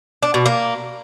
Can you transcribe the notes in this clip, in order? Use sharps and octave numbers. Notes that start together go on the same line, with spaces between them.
D4
B2
A#3